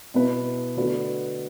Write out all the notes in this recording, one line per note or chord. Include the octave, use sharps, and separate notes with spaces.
B2 B3 E4 B4
D3 A3 F#4 B4